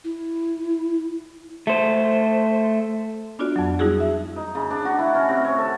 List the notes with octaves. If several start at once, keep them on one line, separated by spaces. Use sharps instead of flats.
E4
A3 C5
B3 D4 F4 F#4 D5
F2 F#3
G3 D#4 E4 F#4 G#4
E5
D#4
C#3
D4
F#4
E4
C#4
C3
C#5
A4